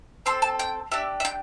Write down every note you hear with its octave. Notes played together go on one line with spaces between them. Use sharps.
C4 A4 C6
A5
G5
D4 G4 E5
E5
G5